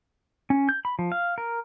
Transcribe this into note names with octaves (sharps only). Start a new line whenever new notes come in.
C#4
G6
B5
F3
F5
A#4